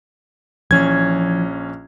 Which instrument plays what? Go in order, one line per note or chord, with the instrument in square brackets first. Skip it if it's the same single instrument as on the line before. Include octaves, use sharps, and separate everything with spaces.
[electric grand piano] A#1 C#4 G#6 [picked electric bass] E3 F3